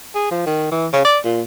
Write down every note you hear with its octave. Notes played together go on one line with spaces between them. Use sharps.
G#4
F3
D#3
E3
C#3
D5
A#2